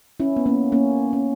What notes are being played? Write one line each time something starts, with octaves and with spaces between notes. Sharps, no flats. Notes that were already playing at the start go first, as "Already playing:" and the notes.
C#4 E4
B3
A#3 C#4
A#3 C#4
C#4